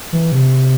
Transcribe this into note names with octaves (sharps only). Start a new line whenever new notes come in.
E3
C3